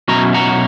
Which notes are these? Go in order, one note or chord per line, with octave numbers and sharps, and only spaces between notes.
B2 F#3 C#4 E4 A#5
F#5 A#5